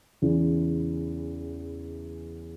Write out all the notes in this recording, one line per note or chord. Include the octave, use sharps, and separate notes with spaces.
E2 C#3 E3